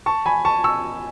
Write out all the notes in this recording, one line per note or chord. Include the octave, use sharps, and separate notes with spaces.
A5 C#6
G#5 B5
A5 C#6
C#6 E6